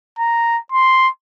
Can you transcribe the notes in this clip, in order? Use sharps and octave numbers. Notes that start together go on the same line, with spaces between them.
A#5
C6